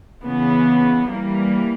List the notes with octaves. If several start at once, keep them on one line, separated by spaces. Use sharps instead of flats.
C#3 E3 B3
E3 G3 A#3